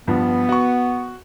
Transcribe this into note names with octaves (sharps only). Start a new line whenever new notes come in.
G2 F3 B3
F#4 C#6